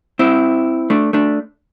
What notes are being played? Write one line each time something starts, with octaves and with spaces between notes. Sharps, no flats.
C4 E4
A3 D4
A3 D4